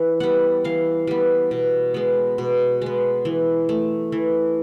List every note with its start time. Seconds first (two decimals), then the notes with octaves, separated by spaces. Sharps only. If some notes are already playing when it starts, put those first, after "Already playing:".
Already playing: E3
0.20 G3 B3 F#5
0.64 E3 F5
1.07 G3 B3
1.51 B2
1.94 G#3 B3
2.38 B2
2.82 G#3 B3
3.25 E3
3.69 A3
4.12 E3